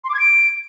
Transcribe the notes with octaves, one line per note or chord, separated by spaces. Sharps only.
C6
D6
G#6
D7